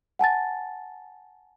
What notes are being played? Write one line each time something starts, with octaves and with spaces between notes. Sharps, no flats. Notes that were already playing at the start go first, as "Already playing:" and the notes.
F#5 G#5 A5 A6